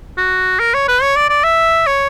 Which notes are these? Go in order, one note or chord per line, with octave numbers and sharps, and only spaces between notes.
F#4
A#4
C#5
B4
C#5
D5
D5
E5
C#5